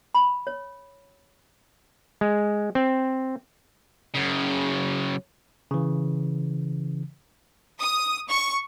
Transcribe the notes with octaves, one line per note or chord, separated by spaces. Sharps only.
B5
C#5
G#3
C4
F#2 C#3
C#3 E3
D#6
C#6